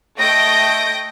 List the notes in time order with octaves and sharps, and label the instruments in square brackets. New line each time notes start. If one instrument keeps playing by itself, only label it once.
[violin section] A3 D#5 G5 G6 A#6 D7